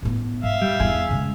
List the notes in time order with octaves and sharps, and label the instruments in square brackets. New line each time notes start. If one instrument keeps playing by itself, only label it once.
[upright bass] A2 B3
[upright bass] G#2 [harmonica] E5 F5
[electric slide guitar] G3
[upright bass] E2 E4 [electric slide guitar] G#4
[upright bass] C#3 G#3